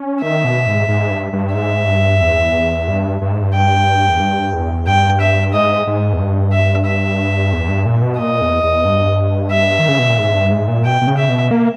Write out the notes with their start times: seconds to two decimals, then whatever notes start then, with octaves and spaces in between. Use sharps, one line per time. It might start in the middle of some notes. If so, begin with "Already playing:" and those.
Already playing: C#4
0.22 D#3 E5
0.44 B2
0.66 G#2
0.88 G#2
1.11 G2
1.33 G2
1.55 G#2 E5
1.87 G2
2.21 E2
2.88 G2
3.21 G2
3.32 G#2
3.42 G2
3.54 G5
4.09 E2
4.20 G2
4.54 E2
4.87 G2 G5
5.20 E5
5.53 G#2 D#5
5.87 G#2
6.13 E2
6.19 G2
6.52 E5
6.86 E5
7.53 E2
7.68 G2
7.86 A#2
8.02 B2
8.18 A#2 D#5
8.41 E2
8.63 E2
8.85 G2
9.51 E5
9.79 D#3
9.88 C#3
9.99 B2
10.08 A#2
10.19 G#2
10.34 G2
10.51 G#2
10.68 A#2
10.85 B2 G5
11.01 B2
11.07 C#3
11.17 E5
11.29 B2
11.51 A#3